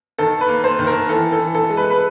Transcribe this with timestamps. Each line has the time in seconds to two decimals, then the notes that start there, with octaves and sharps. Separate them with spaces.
0.18 D#3 A4
0.41 B4
0.49 A#3
0.64 C5
0.79 D#3
0.87 A#4
1.09 E3 A4
1.32 A4
1.39 E3
1.55 A4
1.69 G#3
1.77 B4
1.90 B4